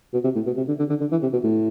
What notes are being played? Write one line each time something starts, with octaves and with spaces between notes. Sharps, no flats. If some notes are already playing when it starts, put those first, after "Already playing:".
B2
C3
A2
B2
C3
D3
D3
D3
D3
E3
C3
B2
A2